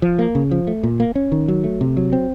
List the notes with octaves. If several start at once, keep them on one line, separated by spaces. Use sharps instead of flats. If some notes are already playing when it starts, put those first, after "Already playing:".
F3
A#3
C#3
F3
A3
A#2
A#3
C#4
D#3
F#3
A3
C3
F#3
C4